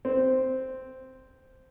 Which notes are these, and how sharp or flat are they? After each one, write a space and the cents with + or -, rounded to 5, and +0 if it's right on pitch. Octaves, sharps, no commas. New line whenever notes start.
C4 -5